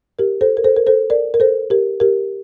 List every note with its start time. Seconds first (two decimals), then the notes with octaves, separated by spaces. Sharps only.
0.19 G4 A#4
0.41 A4 C5
0.57 A#4
0.64 A4 C5
0.76 A#4
0.87 A4 C5
1.10 A#4 D5
1.34 A#4
1.40 A4 C5
1.70 G4 A#4
2.00 G4 A#4